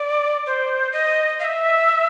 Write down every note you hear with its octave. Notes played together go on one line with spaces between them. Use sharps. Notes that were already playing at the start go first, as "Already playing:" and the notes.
Already playing: D5
C5
D#5
F5
E5